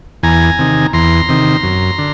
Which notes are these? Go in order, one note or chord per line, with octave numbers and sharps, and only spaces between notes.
E2 G#5 A#5
C3 D#3
E2 A#5 C6
C3 D#3
F#2
D3